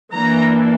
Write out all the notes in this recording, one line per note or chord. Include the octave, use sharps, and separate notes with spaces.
E3 A#3 D4 A#5